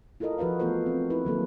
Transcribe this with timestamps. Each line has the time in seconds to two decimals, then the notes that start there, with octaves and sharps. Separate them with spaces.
0.20 E4 F4 A4 A#4 D#5
0.38 F3 F#4 B4 C5 F5
0.60 E3 A3 B3 F4 A4 C5
0.86 C4
1.10 E4 B4
1.25 D#3 F#3 A#3 A4